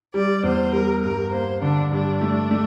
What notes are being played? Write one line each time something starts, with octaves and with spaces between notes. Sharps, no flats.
G3 D5
E2 C5
G3 A#4
G2 A#4
A#3 C5
D3 D4
G2 D4
A3
A3